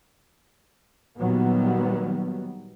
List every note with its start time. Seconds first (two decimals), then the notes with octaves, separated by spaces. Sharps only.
1.17 A#2 D#3 F#3 G3 B3